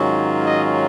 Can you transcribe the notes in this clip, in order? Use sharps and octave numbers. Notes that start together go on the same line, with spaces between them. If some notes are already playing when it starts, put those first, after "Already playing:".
Already playing: G#2 D#3 F#3 C#4 F4
D#5